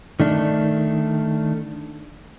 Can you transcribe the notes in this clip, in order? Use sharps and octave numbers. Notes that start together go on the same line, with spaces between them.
D#3 A3 D4